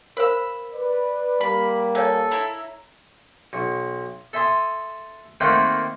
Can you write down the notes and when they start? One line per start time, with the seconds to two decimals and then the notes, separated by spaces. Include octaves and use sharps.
0.17 A#4 C5 F5 B5 E6
0.74 B4 D5
1.41 G3 A#3 B5
1.95 A4 C#5 F5 G#5
2.31 E4 E5 A#5
3.53 B1 C#6
4.33 A4 E5 G#5 C6 D#6
5.40 D#3 A3 A#3 C4 F#5 B5